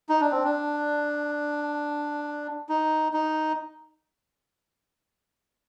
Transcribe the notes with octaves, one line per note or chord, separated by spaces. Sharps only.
D#4
D4
C4
D4
D#4
D#4